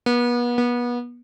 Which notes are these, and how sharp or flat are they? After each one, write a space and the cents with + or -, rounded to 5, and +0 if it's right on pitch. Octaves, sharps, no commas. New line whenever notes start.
B3 -35
B3 -30